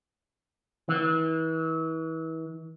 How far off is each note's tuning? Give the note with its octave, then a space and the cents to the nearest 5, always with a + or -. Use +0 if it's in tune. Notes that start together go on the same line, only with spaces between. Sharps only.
E3 -35